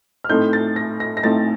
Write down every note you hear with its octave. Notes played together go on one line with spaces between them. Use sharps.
F6
A2 A3 C4 D#4 G6
A6
A#6
A#6
A#6
A2 A3 C4 D#4 A6